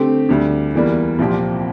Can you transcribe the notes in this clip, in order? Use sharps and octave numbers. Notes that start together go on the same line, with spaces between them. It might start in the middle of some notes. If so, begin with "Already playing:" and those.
Already playing: D3 A3 C4 G4
D2 D3 G3 D4
E2 E3 G3 A#3
C2 A#2 F3 C4 G4